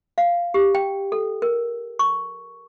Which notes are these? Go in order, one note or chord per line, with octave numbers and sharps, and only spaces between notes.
F5
G4
G5
A4
A#4
C#6